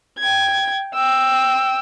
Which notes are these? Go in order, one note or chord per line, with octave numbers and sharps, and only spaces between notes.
G5 G#6
G5 E6